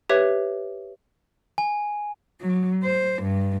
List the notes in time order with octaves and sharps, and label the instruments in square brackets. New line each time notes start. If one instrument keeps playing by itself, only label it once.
[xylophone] G4 B4 C#5 E5
[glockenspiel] G#5
[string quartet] F#3
C5
G2